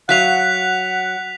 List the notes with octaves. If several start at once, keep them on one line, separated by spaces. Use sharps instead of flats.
F#3 F5 F#5 F#6 B6 F7